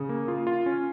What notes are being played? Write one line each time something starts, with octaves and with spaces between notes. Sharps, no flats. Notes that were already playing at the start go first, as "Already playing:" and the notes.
Already playing: C#3
A#3
F4
F4
C#4